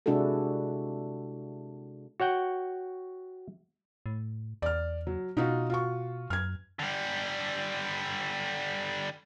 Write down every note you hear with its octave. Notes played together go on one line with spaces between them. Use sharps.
C3 G#3 D4 E4 F#4 A4
F#4 C#5 F#5 G5
A2
E2 D5 F6
F#3
B2 D#4 F4 F#4
F4 F#4 C#6
F#2 F6 G#6
D3 G3